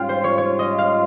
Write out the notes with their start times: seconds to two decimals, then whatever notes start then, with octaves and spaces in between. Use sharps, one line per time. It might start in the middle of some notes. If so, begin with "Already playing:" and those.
Already playing: G#2 G3 C#4 F4 F5 G5
0.09 C5
0.24 C#5
0.38 C#5
0.59 D#5
0.78 F5